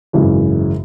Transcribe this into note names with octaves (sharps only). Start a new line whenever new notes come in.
G#1 F#2 C#3 E3 G#3